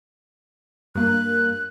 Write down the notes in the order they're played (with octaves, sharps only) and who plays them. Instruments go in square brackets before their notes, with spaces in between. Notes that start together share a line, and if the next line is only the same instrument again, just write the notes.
[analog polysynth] G2 A#3 [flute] F#6